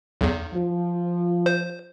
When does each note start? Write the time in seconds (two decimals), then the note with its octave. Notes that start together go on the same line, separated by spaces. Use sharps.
0.21 B1 E2
0.54 F3
1.46 C5